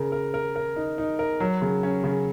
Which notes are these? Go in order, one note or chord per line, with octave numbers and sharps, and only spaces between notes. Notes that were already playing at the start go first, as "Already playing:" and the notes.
Already playing: C#3 A#4
A#4
A#4
A#4
D#4
D#4
A#4
F#3
C#3
C#4
C#3